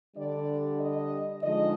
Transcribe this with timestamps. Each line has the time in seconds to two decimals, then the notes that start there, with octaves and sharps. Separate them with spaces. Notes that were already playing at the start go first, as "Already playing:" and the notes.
0.16 D3 G3 D4 D5
0.80 D#5
1.42 D3 F3 G#3 D#4 D#5